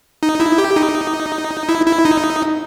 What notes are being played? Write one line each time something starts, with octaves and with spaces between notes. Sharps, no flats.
D#4
E4
G4
D#4
E4
E4
D#4